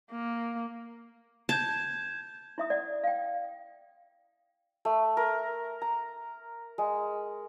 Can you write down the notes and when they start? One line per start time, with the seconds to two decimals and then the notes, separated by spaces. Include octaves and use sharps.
0.12 A#3
1.49 A5 G6 G#6 E7
2.58 E4 E5 D#6
2.70 D5 F#5
3.03 F5 G5
4.85 A3
5.17 A#4
5.82 A#5
6.78 G#3